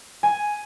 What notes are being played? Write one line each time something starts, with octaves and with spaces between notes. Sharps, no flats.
G#5